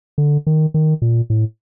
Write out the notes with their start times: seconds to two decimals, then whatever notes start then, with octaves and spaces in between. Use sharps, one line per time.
0.18 D3
0.47 D#3
0.74 D#3
1.02 A#2
1.30 A2